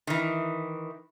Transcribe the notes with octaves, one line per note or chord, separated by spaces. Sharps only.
D#3 E3